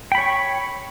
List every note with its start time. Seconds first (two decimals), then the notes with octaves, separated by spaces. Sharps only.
0.12 G5
0.15 B5
0.18 C#5
0.21 C#6